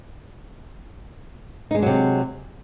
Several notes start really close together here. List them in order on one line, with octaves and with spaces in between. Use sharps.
D#4 G#3 D4 F#3 C3